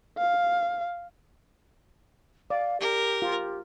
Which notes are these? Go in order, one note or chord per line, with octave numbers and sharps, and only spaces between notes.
F5
D5 F5
G4 A#4
F4